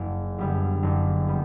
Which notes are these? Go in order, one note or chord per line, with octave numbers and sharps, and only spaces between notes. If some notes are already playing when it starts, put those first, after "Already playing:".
Already playing: F#1
F#2 D3 G3 B3
F#1
G3 B3